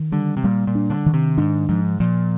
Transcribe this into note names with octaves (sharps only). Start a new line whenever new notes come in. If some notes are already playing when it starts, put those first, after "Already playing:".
Already playing: D#3
D3 G3
C3
A#2 G3
A#2
D4
D3
D#3
C3
G#2 D4
G#2 F3
A#2 F3